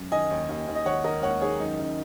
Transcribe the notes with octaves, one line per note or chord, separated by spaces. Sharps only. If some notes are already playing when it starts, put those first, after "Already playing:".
Already playing: F#2
D#3 D#5 G#5
D#2
D#2
D#2
D#5
D#3 C#5 F#5
D#3 A#4 D#5
D#2 C#5 F#5
D#3 G#4 C#5
F#2 D#4
F#1